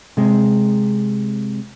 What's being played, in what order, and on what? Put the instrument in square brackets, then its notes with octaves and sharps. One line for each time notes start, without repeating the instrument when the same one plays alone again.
[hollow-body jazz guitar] C3 G#3